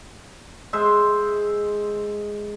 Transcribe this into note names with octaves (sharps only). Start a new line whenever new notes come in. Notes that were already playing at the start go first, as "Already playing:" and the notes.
G#3 C5 E5